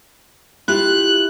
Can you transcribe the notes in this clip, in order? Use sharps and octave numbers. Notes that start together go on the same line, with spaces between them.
E4 F4 G4 F#6